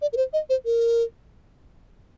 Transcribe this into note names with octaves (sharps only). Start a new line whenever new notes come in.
D5
A#4
C5
D#5
C5
A#4